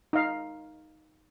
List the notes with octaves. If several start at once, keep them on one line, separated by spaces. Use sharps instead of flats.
D#4 F5